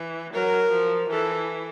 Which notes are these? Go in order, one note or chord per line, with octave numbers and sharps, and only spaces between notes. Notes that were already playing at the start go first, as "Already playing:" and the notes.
Already playing: E3
F#3 A#4
F3
E3 A4